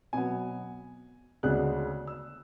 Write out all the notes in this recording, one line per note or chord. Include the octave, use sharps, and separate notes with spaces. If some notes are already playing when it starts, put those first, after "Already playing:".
B2 F#3 B3 G#5
D2 C#3 G#3 B3 D4 F#6
E6